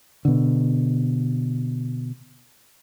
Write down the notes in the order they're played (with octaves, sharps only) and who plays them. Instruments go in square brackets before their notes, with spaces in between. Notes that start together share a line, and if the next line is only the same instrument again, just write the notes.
[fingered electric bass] B2 D3